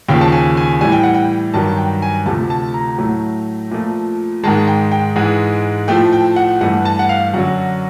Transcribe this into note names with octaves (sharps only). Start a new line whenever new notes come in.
D#2 C#3 F3 G5
A5
G#5
G#5
A2 E3 G3 G#5
G5
F#5
G5
G2 D#3 F#3 A5
G5
G#5
D2 C3 F3 A3 A5
A5
A#5
A2 F#3 A3
A#2 F3 A3
G#2 D#3 G#3 A5
G5
G5
G#2 E3 G#3
A2 F3 A3 G5
G5
F#5
G2 E3 A3 F#5
A5
F#5
F5
F#2 D3 F#3 F#5